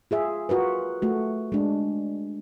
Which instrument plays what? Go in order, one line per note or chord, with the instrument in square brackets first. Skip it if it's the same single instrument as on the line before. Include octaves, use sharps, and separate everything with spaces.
[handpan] F4 G#4 E5
F4 F#4 A#4 B4
A3 F#4
G#3 D4